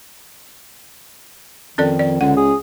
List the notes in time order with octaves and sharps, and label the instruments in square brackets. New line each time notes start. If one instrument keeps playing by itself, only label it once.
[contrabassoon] F2 [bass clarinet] D#3 [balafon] C#4 A4 D5
[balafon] D5
[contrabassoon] C#2 [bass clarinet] D3 [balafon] F#5
[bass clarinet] G#4